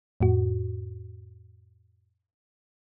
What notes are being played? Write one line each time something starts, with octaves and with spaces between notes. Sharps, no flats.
F2 A2 F#4